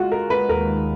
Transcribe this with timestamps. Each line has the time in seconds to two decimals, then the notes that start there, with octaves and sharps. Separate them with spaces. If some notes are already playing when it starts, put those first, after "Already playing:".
Already playing: G#3 F4 F#4
0.11 G#3 A#4
0.30 B4
0.49 D#2 A#4